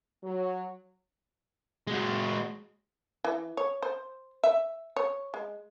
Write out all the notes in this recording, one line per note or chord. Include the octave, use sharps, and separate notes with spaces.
F#3
G#3 F#4
E3
C#5
C5
E5
C#5
G#3